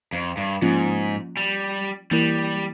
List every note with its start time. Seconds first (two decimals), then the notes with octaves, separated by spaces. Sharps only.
0.13 F2
0.37 G2
0.62 G#2 F3 A#3 C#4 F4
1.37 G3
2.11 E3 G3 A#3 E4 A#4